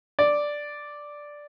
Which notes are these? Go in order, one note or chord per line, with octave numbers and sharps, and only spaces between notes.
D5